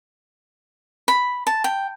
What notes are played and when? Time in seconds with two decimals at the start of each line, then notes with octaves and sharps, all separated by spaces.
1.08 B5
1.47 A5
1.64 G5